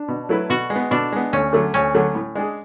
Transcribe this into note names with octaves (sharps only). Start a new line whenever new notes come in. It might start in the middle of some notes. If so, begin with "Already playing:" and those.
Already playing: D4
B2
F#3 A3 E4 B4
B2 F#4
G#3
B3
B2 D4
G#3 B3
D2 C#4
D3 F#3 A3
D2 C#4
D3 F#3 A3
A2
G#3 D4 G#4